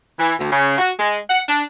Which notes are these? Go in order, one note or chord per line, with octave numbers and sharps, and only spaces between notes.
E3
D2
C#3
F#4
G#3
F#5
D4